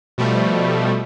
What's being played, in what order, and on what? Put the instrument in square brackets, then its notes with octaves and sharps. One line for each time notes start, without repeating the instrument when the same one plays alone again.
[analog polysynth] B2 F3 G3 A3